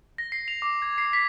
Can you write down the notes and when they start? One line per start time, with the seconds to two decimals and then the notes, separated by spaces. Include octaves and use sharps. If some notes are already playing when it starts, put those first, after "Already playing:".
0.18 A#6
0.32 C7
0.48 F7
0.62 D6
0.82 G#6
0.98 C7
1.13 B6